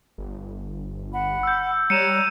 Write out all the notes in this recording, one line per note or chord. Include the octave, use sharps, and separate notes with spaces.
G1
F#5 B5
E6 G6
G3 C#5 A#5 F#6 C#7 D#7 E7